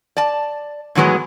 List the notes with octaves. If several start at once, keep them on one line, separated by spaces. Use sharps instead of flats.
D5 A5
A2 D#3 E3 F#3 G#3 B3